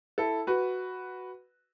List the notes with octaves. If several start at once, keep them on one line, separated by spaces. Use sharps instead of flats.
E4 A4
F#4 B4